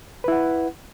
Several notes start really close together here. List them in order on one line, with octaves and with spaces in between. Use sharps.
B4 E4 F#5